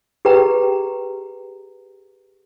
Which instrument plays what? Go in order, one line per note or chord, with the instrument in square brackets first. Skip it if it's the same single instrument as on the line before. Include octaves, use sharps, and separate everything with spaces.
[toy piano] G4 G#4 B4 G5 A#5